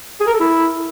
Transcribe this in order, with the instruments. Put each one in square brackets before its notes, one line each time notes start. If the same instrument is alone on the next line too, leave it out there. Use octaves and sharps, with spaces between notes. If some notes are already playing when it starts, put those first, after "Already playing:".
[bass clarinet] G#4
A#4
A4
E4